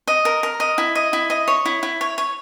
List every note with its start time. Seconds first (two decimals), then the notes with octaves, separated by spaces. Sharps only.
0.07 D#5
0.25 A#4
0.43 A#4
0.60 D#5
0.78 E4
0.95 D#5
1.13 E4
1.30 D#5
1.48 C#5
1.65 E4
1.83 E4
2.01 C#5
2.18 C#5